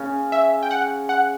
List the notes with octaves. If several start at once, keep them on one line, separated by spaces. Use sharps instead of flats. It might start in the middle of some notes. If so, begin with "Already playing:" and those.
Already playing: C#3 C#4
E5
G5
F#5
F#5